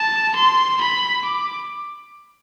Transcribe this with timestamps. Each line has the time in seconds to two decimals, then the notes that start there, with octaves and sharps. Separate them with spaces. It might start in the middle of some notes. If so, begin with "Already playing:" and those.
Already playing: A5
0.35 C6
0.81 B5
1.25 D6